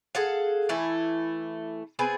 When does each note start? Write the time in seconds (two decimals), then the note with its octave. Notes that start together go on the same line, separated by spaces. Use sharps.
0.15 G#4 A4 F5 F#5
0.69 E3 A3 E4
1.99 B3 C4 G#4 G#5